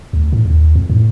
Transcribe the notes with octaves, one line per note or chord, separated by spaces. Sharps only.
D2
A2
D#2
F2
A2